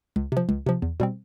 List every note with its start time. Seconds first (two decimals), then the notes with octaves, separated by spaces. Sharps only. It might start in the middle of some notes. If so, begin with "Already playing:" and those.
0.16 C#2
0.32 C3 F3
0.49 C#2
0.66 C3 F3
0.82 E2
1.00 B2 G3 C4